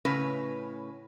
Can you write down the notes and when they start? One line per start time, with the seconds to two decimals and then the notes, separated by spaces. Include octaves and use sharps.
0.05 A2 C#3 C#4 B4